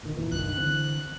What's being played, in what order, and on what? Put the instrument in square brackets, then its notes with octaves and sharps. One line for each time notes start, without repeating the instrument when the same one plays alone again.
[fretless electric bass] A#2 D#3
F2 A#2 E3
[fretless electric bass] C2 G2 D#3 [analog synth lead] F#6
[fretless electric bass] D3 E3 C4